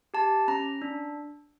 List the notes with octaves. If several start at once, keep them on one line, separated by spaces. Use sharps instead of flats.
G4 A5
C#4 A#5
D4